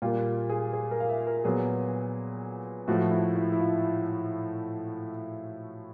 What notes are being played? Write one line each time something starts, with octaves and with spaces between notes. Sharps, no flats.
A#2 G3 A#3 F4
G#4
G#4
A#4
F5
E5
A#4
A#2 F#3 B3 G#4
A2 F3 A3 F#4
E4
E4
E4
F4